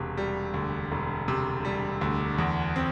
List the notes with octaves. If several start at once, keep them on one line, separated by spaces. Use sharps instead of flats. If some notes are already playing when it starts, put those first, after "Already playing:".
Already playing: E1 C3
G3
D2
E1
C3
G3
D2
E2
C4